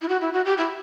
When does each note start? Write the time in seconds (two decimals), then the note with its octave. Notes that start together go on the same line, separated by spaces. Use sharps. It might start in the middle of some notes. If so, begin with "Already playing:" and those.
0.02 E4
0.09 F#4
0.21 E4
0.33 F#4
0.45 G4
0.58 E4